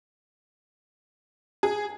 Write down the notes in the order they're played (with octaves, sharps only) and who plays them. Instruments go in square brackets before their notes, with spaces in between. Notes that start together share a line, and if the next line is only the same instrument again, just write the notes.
[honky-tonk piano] G#4